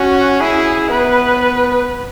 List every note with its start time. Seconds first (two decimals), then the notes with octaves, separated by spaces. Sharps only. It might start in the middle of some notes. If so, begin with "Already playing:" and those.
Already playing: C#4 F#4
0.41 E4 G#4
0.89 B3 B4